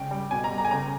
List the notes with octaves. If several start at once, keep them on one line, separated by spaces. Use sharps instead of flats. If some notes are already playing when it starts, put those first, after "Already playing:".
Already playing: C#3 G#3 G5
G3
B2 G#5
A#5
G3
A#5
G#5
C#3 A#5